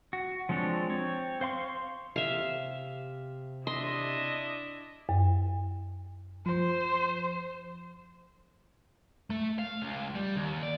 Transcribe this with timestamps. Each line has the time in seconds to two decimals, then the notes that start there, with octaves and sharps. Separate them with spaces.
0.13 F#4
0.49 F3 G#3 C4 D4 C#5
0.90 C4 C#5
1.41 C5 F5 C6 C#6
2.16 C3 E5 F5
3.67 D4 E4 D#5 E5 C6
5.09 F#2
6.46 F3 C5
9.30 A3
9.59 F5
9.82 C#2
10.15 G3
10.36 D#2
10.63 D5